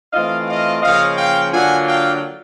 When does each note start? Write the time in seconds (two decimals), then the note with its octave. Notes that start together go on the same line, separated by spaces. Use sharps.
0.13 E3 A3 C4 F4 D#5 F5
0.48 D#5 F5
0.83 C#3 F3 A#3 C#4 D#5 F5
1.18 F5 G5
1.53 D3 F#3 A#3 D4 F4 F#5 G#5
1.88 F5 G5